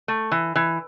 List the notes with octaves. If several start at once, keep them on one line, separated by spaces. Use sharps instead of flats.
A3
E3
E3